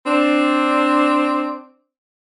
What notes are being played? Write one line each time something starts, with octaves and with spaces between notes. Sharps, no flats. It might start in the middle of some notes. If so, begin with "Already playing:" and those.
C4 D4